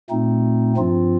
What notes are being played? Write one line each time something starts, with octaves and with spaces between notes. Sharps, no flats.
A#2 A3 C4 D#4
G2 F3 C4 F4